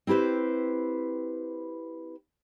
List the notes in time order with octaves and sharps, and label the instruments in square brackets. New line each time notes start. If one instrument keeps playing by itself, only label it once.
[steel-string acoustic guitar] C4 E4 G4 B4 C5